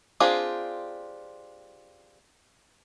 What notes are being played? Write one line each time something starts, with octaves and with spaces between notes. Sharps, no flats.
C4 D4 F4 G4 G#4